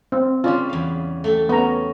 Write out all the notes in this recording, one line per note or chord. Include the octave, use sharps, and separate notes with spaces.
C4
C#3 G3 F4 D5
E2 F5
A3 G4 A4
B3 C#4 A#5